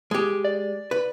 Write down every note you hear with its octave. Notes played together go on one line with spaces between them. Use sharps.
G#3 G4
D5
B4